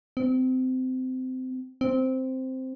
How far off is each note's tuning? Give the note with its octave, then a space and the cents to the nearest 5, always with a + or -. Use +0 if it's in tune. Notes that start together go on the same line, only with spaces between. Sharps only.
C4 -25
C4 -5